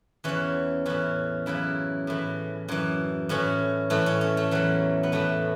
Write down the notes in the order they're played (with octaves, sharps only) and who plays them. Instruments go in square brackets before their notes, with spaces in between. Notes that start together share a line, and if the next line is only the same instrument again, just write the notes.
[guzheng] E2 E3 C#4
A2 E3 C#4
F#2 C#3 E3 E4
A2 E3
F#2 E3
A2 E3 C#4
A2 E3 A3
C#4
C#4
A3
E2 E3 F#3
B3
A2 E3 A3